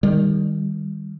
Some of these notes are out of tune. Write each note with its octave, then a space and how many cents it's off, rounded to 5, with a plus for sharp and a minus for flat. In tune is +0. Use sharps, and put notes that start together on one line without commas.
D#3 +0 G3 +20